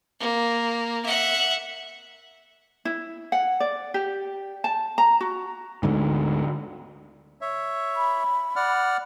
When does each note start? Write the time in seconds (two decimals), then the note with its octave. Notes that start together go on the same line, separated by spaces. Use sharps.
0.20 A#3
1.05 E5 F#5
2.85 E4
3.32 F#5
3.60 D5
3.94 G4
4.64 A5
4.98 A#5
5.21 F#4
5.83 D2 G#2 D3
7.41 C#5 E5
7.96 B5
8.56 D5 F#5 F6